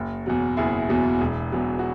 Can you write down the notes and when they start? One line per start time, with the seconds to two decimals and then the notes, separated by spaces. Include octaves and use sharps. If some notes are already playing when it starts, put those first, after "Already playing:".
Already playing: F#1 F#4
0.26 E2 B2 F#3
0.57 F#1 E4 G#4
0.89 E2 B2 F#3
1.21 E1
1.52 E2 B2 F#3
1.79 F#4